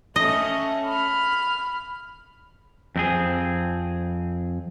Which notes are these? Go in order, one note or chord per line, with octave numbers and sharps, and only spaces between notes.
A3 C#4 D#5
B5 F6
F2 C4 G#4